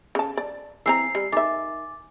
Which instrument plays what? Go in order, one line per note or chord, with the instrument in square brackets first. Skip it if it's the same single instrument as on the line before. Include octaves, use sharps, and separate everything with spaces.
[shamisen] C#3 A5
D5
[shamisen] E3 C4 A#5 [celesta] G#5 E6 C7
[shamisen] G3
[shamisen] D#3 E5 [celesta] G#5 D6 A6